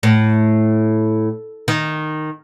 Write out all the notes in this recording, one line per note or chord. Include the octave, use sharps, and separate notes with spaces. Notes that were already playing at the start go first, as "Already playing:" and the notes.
A2
D#3